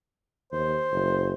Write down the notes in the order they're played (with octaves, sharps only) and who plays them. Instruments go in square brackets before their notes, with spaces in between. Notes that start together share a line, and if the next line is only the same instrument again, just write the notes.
[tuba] D#2 [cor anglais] C5
[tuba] F#1